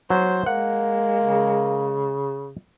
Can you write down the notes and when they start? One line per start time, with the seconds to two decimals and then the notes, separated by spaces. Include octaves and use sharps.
0.10 F#3 C5
0.46 G#3 A#3 F#5
1.24 C#3